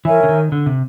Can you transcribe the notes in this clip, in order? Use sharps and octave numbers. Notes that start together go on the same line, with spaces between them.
E3 A#4 C#5 E5 G#5
D3
D#3
D3
C3